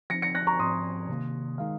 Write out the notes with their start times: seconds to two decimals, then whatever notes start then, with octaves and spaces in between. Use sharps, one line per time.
0.10 F3 C4 D#4 A#6 C#7
0.22 A#6 C#7
0.35 F#6 A#6
0.47 A#5 C#6
0.59 G#2 F3 C4 C6 D#6
1.08 C3 D#3 A#3
1.58 D#3 G#3 D#4 F5